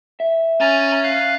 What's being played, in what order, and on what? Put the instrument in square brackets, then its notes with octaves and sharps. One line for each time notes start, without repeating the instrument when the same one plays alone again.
[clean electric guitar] E5
[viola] C#4 [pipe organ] G#5 A#5 A6
[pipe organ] F5 F#6